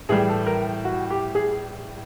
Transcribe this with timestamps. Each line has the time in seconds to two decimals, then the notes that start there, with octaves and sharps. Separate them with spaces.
0.09 A2 E3 G3 G#4
0.28 A4
0.47 A#4
0.85 F#4
1.10 G4
1.35 G#4